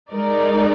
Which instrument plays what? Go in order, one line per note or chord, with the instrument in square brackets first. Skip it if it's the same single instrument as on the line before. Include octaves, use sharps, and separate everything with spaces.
[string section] G#3 D#4 A#4 D5